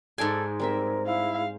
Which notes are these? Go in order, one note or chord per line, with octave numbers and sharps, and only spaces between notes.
G#2 G#3 A4 D5 F5 G#5
G3 C4 A#4 E5
E4 F5